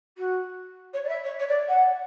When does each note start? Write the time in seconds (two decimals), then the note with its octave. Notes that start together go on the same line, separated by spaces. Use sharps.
0.17 F#4
0.93 C#5
1.04 D5
1.08 E5
1.24 C#5
1.39 C#5
1.48 D5
1.68 F#5